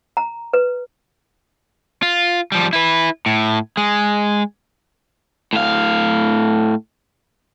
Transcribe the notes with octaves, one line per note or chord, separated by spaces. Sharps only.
A#5
B4
F4
F3 G3
E4 B4
A2
G#3
A2 F5